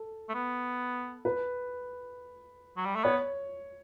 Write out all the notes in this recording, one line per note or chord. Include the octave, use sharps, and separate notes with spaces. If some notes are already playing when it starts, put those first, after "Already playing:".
Already playing: A4
A3
B3
B4
F#3
G3
A3
B3 C#5